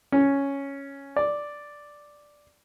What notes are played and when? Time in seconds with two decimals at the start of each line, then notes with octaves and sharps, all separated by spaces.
0.12 C#4
1.16 D5